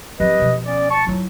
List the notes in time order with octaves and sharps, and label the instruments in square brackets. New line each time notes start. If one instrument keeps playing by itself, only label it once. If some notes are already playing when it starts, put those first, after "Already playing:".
[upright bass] F3 C4 [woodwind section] G4 B4 D#5
[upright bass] B2 F3
[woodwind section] B3 C#4 D5
A5 C#6
[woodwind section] F#3 [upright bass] E4 F4